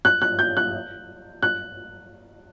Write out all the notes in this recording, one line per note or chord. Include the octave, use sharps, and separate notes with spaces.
F#6
F#6
G6
F#6
F#6